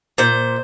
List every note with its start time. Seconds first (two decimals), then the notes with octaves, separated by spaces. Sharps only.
0.18 A#2 C5